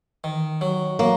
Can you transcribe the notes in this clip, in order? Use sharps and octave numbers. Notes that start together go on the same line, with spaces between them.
D#3
F#3
F#3 A#3